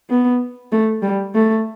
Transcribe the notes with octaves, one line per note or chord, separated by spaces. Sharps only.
B3
A3
G3
A3